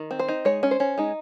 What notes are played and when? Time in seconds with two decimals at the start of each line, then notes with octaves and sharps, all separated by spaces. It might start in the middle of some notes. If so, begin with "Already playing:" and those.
Already playing: D#3
0.11 C4
0.19 C5
0.28 D#4
0.45 G#3 C#5
0.63 C#4
0.71 C5
0.80 C#4
0.98 G#3 D#4